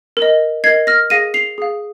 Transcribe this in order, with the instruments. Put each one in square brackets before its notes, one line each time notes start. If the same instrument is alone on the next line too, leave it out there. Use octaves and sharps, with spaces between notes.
[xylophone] A#4
D#5
A#4 D#5 G#6 C7
F6 A#6
G#4 F5 A#6 D#7
C7 F7
G#4 F5